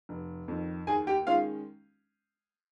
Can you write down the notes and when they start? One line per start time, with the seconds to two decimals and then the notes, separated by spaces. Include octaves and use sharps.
0.09 F1
0.48 F2 D#3
0.87 D#2 G#4 G#5
1.07 G4 G5
1.27 D#3 G#3 C#4 F4 F5